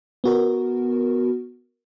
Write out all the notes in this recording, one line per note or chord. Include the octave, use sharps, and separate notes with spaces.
B3 F#4 A#4